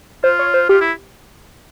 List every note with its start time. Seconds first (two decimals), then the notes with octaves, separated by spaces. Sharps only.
0.24 F4 C5
0.39 C#5
0.54 C5
0.69 F4 G4
0.81 E4